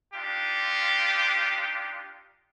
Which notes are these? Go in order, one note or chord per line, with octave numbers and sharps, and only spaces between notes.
D4 D#4 F4 G4